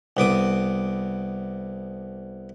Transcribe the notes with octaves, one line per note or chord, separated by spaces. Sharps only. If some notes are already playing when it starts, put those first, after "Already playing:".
C2 B3 D6 D#6